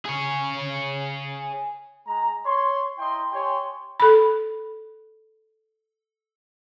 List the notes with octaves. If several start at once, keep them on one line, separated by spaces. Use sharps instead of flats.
G#4 C#5
G#3 A#5
C#5 C6
E4 D#5 G5 A#5 C6
G4 C#5 G5 G#5 C6
A4 B5